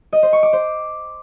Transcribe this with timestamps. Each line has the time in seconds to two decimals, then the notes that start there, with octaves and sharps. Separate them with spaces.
0.13 D#5
0.23 C5
0.33 C#6
0.43 D6
0.53 C5